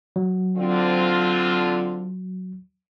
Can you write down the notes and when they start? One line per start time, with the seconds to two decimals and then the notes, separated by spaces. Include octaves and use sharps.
0.16 F#3
0.57 D3 C4 F4